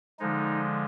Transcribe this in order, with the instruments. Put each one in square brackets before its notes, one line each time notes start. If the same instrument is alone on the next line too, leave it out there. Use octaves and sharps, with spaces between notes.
[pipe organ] D3 F3 G#3 D#4